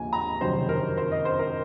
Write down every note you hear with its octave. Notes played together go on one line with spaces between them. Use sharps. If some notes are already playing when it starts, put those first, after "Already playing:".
Already playing: D#2 C#3 F3 A#3 G#5
A#5
F#1 F2 C3 D#3 F#3 C5
A#4
C5
D#5
C5
A#4